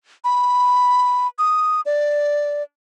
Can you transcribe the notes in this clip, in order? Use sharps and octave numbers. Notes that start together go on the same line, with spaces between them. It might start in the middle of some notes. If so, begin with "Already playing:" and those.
B5
D#6
D5